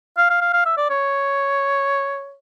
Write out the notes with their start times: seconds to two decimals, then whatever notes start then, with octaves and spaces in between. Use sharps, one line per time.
0.18 F5
0.30 F5
0.41 F5
0.53 F5
0.66 E5
0.77 D5
0.90 C#5